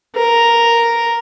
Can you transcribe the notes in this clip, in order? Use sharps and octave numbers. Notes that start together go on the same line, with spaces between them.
A#4